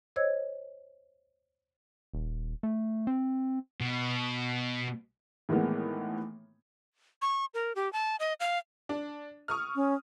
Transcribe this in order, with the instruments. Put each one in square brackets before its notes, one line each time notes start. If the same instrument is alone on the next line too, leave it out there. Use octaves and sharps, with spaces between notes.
[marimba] C5 C#5 D#5 E6 G#6
[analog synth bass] D#1
A3
C4
[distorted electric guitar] B2
[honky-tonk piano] A2 D#3 E3 G#3 A#3 B3
[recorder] C#6
A#4
G4
A5
D#5
F5
[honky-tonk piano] D4
C#6 D#6 F6
[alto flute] C#4